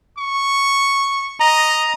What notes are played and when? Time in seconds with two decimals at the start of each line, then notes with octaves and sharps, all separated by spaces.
0.18 C#6
1.40 D#5 A#5